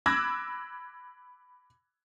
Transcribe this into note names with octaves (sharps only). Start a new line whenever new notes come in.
B5 D6 E6 F#6 G#6 A#6